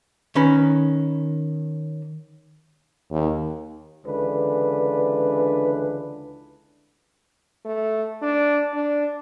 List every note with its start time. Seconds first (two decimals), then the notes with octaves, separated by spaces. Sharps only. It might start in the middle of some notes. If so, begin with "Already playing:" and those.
0.35 D#3 C#4 B4
3.11 D#2
4.05 C#2 D3 E3 D4 B4
7.65 A3
8.22 D4
8.74 D4